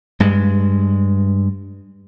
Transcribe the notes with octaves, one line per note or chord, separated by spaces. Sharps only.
G2 G#3